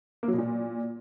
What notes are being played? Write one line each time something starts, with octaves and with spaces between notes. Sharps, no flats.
A#3
F#3
B2
A#2